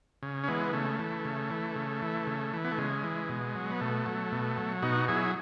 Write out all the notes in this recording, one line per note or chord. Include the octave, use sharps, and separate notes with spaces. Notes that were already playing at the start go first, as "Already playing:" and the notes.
C#3
C#4
E3 G#3 B3
C#3 A3
E3
C#3
E3
C#3
E3
C#3
E3
B3
A3
C#3 G#3
E3
B2
F#3
B3
B2 A3
F#3
B2
F#3
B2 D#4 F#4
F#3 E4 G#4